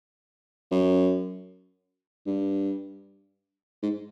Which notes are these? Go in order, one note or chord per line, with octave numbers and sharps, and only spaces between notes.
F#2
G2
G#2